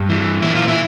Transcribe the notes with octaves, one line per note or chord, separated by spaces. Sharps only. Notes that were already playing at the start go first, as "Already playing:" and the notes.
Already playing: G2
E3
A#2 E4
F4
E4